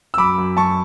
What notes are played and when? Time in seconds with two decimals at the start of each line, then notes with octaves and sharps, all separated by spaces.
0.14 E6
0.17 F#2 B5 D6
0.38 F#2
0.57 F#2 A5 C#6